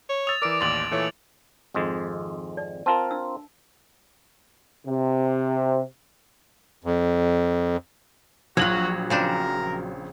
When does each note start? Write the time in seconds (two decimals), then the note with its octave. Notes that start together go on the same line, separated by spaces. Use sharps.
0.09 C#5
0.27 D#6 E6 A6 F7
0.42 E3 A#4 D5 D6 D7
0.61 A1 D#2 C6 A6 F#7
0.91 A#2 E3 A3 C#5
1.74 G#1 F2 G#3
2.57 D5
2.86 C4 F4 A#4 A5
3.11 D4 E6
4.87 C3
6.84 F2
8.57 A#1 F#3 F4 F#4 F#7
9.10 C#3 C4 D4 A#4